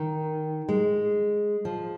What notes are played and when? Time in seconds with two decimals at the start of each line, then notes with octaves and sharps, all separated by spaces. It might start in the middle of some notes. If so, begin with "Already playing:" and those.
Already playing: D#3
0.69 G#3
1.65 F3